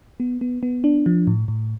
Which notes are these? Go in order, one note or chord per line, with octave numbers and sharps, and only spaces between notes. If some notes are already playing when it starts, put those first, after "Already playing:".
B3
B3
B3
D4
F3
A2
A2